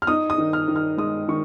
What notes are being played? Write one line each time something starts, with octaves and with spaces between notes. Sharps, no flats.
F6
D#4 D#6
D#6
D#3
F6
D#3
F6
G#3 D#6
D#3 C#6